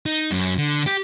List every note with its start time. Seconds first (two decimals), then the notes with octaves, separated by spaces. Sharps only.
0.06 D#4
0.31 F#2
0.58 D3
0.86 G4